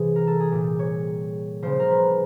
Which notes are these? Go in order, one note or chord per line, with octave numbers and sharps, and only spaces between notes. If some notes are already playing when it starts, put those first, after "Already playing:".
Already playing: C3 E3 G3 G#4
A#4
A4
G#4
A#2 G3 G4
C#5
C#3 F3 C5
A#4
B4